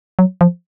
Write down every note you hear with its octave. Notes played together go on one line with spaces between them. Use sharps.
F#3
F3